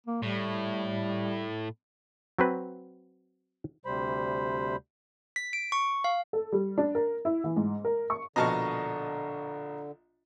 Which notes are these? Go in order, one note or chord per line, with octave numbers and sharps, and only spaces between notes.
A#3
A2 G3
F#3 C4 B4
D2 C3 G3 C5 B5
B6
D7
C#6
F5
A4
G3
D4
A#4
E4
E3
G#2
A#4
C#6
A#1 B2 D3 D#5 A5 A#5 C#6 F6